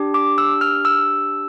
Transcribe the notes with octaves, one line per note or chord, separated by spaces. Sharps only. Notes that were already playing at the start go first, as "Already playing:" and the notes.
Already playing: D4 G4
D6
E6
F6
E6